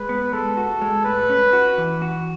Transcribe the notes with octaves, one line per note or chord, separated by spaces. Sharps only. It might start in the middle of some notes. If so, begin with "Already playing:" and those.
Already playing: G#3 B4
B3
G#3 A4
F#4
G#3
A2 B4
C#4
F#4
E3
F#4